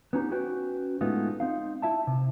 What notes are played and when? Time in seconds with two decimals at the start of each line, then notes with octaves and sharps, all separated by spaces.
0.13 B3 C#4 D#4 G4
0.31 C#4 F#4 B4 C5 G5
1.01 A2 G#3 A3 B3 D#4 F4
1.40 C4 D#4 F5
1.82 E4 E5 A5
2.07 C3